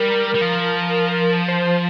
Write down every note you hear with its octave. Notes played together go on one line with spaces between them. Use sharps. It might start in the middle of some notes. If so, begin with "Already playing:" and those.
Already playing: G3 A#4
G3
F3
C5